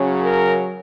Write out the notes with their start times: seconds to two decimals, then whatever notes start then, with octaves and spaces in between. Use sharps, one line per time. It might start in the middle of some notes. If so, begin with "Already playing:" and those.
Already playing: C#3 F#3 C#4
0.24 A#4